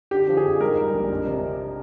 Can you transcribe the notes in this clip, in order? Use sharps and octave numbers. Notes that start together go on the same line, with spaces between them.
D3 G4
F3
G#4
F2
G#2 A#4
G3
A#1
F2
C3